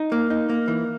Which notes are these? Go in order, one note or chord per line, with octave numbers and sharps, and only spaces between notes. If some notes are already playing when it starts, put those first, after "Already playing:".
Already playing: D#4
A#3
D#4
A#3
E3